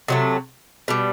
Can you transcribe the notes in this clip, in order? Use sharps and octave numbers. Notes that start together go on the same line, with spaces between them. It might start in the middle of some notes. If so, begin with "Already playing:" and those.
C3 F#3 A3
B2 G3